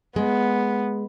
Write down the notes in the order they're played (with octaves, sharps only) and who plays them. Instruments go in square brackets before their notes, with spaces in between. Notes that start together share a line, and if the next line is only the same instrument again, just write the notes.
[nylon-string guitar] G#3 [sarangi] B3